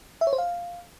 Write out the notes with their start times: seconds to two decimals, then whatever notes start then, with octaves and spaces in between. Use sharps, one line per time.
0.21 E5
0.27 C#5
0.33 C5
0.38 F5